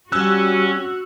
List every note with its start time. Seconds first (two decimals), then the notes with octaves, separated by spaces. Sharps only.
0.12 G3 C#4 F#4 E6 F#6